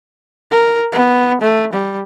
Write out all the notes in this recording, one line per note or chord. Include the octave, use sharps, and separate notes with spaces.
A#4
B3
A3
G3